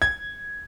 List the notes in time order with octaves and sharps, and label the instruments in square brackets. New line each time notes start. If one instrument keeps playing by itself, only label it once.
[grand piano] G#6